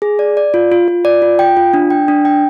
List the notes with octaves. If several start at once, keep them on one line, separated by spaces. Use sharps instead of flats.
G#4
D5
D5
F4
F4
F4
D5
F4
G5
F4
D4
G5
D4
G5